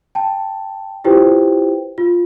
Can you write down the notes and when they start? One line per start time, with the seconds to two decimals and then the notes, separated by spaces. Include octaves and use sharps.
0.15 G5 A5
1.04 E4 F4 G4 B4 C5 G5
1.98 F4